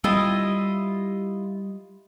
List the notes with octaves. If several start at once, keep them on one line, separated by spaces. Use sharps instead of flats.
G3 E4 F4 D#5